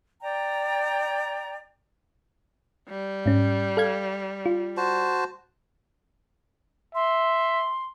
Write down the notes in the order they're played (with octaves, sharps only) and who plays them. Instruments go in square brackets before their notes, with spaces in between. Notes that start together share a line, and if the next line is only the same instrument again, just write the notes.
[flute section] D5 G5 A#5
[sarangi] G3
[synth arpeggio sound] G#2 C#4
A4 F5 G#6
F4
[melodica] F#4 C5 A5
[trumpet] E5 [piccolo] C6